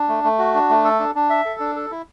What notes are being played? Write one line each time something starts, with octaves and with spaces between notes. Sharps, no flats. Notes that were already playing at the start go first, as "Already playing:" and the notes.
Already playing: D4
A3
A3
F#4
D4
A3
A4
D4
D4
E5
A4
D4
A4
E4